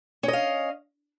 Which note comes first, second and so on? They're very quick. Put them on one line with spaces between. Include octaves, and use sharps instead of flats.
C#4 D#5 F5